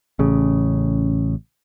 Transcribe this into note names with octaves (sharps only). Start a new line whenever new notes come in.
A1 C#3